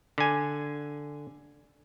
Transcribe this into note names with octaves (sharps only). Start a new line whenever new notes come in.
D3 G#5